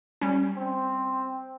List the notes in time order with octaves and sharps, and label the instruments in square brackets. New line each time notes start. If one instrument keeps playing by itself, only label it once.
[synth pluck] G3 C#4
[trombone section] C4